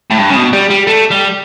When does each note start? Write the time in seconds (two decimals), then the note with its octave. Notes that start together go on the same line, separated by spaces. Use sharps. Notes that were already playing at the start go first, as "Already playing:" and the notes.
0.11 A2
0.19 G2
0.30 C#3
0.36 B2
0.53 G3
0.70 G3
0.87 A3
1.11 G3